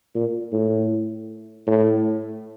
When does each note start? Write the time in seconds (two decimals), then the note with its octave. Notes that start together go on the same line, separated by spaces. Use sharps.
0.15 A#2
0.52 A2
1.67 A2